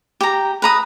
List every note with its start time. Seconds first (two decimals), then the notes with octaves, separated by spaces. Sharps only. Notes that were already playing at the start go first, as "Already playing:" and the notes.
0.21 G4 A#5
0.62 B4 A#5 D#6